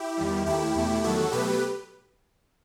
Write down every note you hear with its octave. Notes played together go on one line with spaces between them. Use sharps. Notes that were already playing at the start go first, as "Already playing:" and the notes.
Already playing: E4 G4
E2 D#3 G3
D#2 D#3 A3 E4 G4
E2 B2 A3
E2 D#3 F#3 A3 F#4 A4
B2 F#3 A3 G4 B4